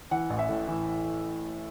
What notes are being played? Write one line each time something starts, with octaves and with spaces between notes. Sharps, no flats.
E3 F#5
A1
E5
A2
E3